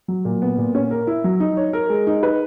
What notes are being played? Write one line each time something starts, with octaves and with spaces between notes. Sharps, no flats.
F#3
A#2
B3
A#2
C#4
A#4
E4
F#3
D#4
C#5
A#4
G#3
D#4
B4